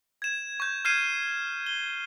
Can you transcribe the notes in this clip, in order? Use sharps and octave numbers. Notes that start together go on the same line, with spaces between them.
G#6 E7
C#6 G6
F6 G6 G#6 C7 D#7 E7
G7